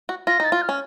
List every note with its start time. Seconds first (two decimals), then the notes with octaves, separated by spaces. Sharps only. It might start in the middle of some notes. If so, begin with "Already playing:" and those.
0.09 F#4
0.27 F4 A#6
0.40 D#4 A6
0.52 F4
0.62 F6
0.69 C#4